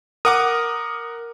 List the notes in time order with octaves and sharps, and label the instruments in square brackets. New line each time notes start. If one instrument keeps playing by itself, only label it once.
[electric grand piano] A#4 F#5 D6 [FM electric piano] D#6